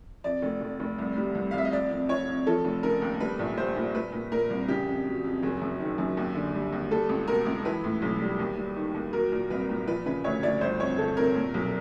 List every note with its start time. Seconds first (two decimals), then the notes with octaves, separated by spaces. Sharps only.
0.24 F2 D5
0.42 F1
0.61 F1
0.80 F1
0.98 C2
1.17 G3
1.35 C2
1.51 F5
1.54 C2 E5
1.65 D#5
1.72 F2 D5
1.91 F2
2.09 F2 C#5
2.28 F2
2.47 F3 A4
2.64 F1
2.83 C#3 A#4
3.02 D#2
3.20 G3 B4
3.39 A#1
3.57 G3 C5
3.76 A#2
3.95 A#2 B4
4.13 A#2
4.32 A#2 A#4
4.50 C2
4.68 C#3 G4
4.87 F2
5.06 F#3
5.24 F2
5.43 F#1 G#4
5.61 F#2
5.80 D#3
5.98 F#2
6.17 D#2
6.35 D3
6.54 G3
6.72 D#2
6.91 G3 A4
7.09 C#2
7.28 B2 A#4
7.46 C#2
7.65 E3 B4
7.84 A2
8.02 B1
8.20 G3
8.39 D#2
8.58 G3
8.76 D#3
8.94 D#2
9.13 F#3 A#4
9.32 A#2
9.50 C2 B4
9.69 A#2
9.87 F3 B4
10.06 C#3 B4
10.24 D2 C#5
10.43 D2 D5
10.61 G1 C5
10.80 F2 C#5
10.98 G1 A4
11.17 C3 A#4
11.36 A#2
11.54 B1